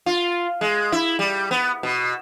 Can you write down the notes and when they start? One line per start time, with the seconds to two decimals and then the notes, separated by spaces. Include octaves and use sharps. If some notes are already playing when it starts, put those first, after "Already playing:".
0.06 F4
0.61 G#3
0.92 E4
1.19 G3
1.51 B3
1.83 B2